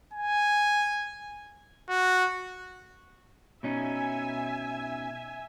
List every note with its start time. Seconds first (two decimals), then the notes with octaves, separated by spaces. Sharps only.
0.13 G#5
1.89 F#4
3.63 B2 C#4 D#4 E5 G#5